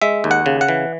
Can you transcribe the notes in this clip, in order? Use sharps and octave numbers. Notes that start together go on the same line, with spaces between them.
G#3 E5
D#2
F#5
C#3
F#5
E3